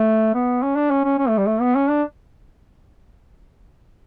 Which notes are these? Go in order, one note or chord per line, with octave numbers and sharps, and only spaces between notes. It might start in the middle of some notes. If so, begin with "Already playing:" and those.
Already playing: A3
B3
C#4
D4
C#4
C#4
C#4
A3
G3
A3
B3
C#4
D4